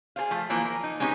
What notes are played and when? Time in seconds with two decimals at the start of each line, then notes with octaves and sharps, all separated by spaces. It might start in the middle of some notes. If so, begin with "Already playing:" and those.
0.16 G#4 A4 C5 F5
0.31 F3 A3
0.50 E3 F3 A#3
0.65 A#4
0.84 D#4
1.00 G#3 B3 C#4 D#4 G4